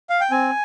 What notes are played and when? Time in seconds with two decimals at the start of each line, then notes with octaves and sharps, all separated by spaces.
0.10 F5
0.21 G5
0.31 C4 G#5